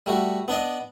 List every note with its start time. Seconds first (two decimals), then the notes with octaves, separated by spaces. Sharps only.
0.06 G3 A3 F#4
0.48 B3 D4 D5 D#5